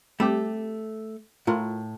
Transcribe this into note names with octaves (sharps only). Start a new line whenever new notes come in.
G3 A3 C4 G4
A2 F4 A#4